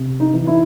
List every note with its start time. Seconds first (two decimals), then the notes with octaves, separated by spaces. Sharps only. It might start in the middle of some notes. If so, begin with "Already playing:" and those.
Already playing: C3
0.20 D#4
0.33 E3
0.47 E4